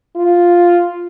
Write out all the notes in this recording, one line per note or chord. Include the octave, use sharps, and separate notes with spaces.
F4